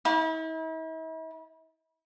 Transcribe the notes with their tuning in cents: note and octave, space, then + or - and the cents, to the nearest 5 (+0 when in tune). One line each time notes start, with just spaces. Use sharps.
E4 -45